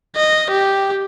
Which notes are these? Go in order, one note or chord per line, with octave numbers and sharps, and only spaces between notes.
D#5
G4